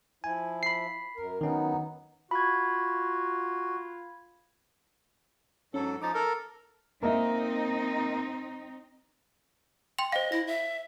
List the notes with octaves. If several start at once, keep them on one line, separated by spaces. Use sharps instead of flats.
F3 E4 G#5
B5 C7
F#2 A#4
D#3 F#3 B3 C#4 D#4
F4 F#4 B5 G#6
G#2 F#3 C#4 A4
F3 D#4 D6 A6
A4 A#4
A#3 C4 D#4 D#5 E5
G5 C6 F7
C5 D#5 F5
E4 A#6
E5